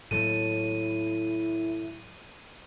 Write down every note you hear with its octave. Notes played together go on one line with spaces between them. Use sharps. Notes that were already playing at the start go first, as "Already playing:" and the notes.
D#2 A2 F#3 E4 A4 C#5 D#7